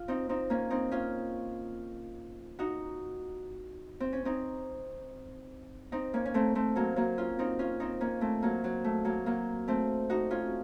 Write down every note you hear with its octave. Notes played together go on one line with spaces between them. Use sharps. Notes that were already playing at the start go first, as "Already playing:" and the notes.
Already playing: F4
C4 D#4
C4 D#4
A#3 C#4
C4 D#4
C#4 F4
D#4 F#4
C4
C#4
C4 D#4
C4 D#4
A#3 C#4
C#4
A3 C4
A3 C4
F#3 A#3
F#3 A#3
C#4 F4
C4 D#4
C#4 F4
C4 D#4
A#3 C#4
A3 C4
F#3 A#3
F#3
A3
F#3 A#3
F#3 A#3
A3 C4
D#4 F#4
C#4 F4